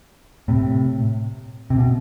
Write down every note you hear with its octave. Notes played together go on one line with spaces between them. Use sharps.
A2 C3
C3
B2